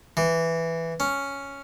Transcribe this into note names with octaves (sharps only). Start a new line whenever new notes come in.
E3
C#4